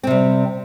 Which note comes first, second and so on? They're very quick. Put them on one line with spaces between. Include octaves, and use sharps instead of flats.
C4 C3 G3